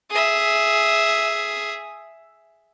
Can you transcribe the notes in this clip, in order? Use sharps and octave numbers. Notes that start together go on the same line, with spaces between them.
G#4 E5